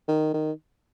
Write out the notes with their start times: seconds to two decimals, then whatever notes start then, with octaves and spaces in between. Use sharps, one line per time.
0.08 D#3
0.34 D#3